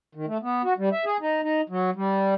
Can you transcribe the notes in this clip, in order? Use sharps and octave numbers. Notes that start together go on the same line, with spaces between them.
D#3
A3
B3
F#4
G3
E5
G#4
D#4
D#4
F#3
G3